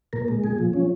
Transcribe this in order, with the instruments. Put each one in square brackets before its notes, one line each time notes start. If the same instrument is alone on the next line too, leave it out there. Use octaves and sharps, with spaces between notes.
[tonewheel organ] A#2 A#4
G#3
A#2 G#4
F3
F3 C#4